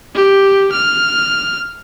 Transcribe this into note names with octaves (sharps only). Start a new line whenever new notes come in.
G4
F6